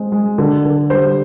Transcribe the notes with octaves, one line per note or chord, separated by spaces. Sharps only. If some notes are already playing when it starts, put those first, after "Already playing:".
Already playing: G#3 C4
G#3
D3
D3
G3 C5